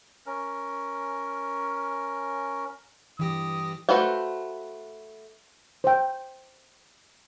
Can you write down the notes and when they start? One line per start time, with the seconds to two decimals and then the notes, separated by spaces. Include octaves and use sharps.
0.26 C#4 A#4
3.19 G2 E3 G4 D#6 A#6
3.89 A3 F#4 B4 C5 F5
5.84 C5 G5